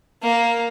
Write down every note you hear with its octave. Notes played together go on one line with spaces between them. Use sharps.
A#3